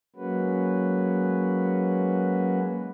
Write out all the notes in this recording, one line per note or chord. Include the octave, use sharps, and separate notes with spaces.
F#3 G#3 A#3 C#4 F#4 B4